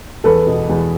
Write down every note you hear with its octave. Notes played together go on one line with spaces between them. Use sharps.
E2 A4 B4
B2
E2